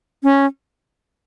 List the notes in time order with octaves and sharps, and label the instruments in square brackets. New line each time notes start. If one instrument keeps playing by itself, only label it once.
[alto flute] C#4